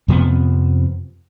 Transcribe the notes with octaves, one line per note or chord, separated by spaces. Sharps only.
F2 C3 F3 B3